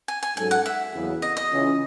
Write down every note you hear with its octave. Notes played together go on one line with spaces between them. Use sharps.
G#5
G#5
G#2 F#3 C#4 F#4 A4 G#5
F#5
E5
E2 C#3 F#3 B3
D#5
D#5
C#2 C#3 E3